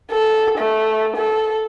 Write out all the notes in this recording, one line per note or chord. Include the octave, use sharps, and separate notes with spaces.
A4
A3
A4